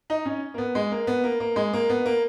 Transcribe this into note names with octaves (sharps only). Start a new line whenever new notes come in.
D#4
C#4
A#3
B3
G#3
A#3
B3
A#3
A#3
G#3
A#3
B3
A#3